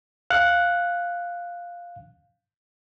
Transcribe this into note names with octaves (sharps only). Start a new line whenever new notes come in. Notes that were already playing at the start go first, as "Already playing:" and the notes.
F5 F#6